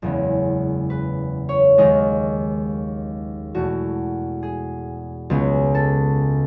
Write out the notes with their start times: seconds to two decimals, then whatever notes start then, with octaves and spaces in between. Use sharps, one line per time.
0.02 F#1 E2 C#3 G#3 B3
0.90 B4
1.49 C#5
1.78 D#2 D#3 G#3 D#4
3.54 E2 B2 A3 F#4
4.43 G#4
5.30 C#2 C#3 G#3 B3
5.75 A4